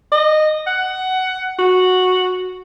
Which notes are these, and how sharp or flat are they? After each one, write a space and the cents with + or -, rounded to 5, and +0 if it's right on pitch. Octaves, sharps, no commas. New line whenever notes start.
D#5 -15
F#5 +15
F#4 -5